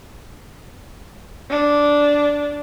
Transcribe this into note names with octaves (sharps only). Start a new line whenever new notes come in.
D4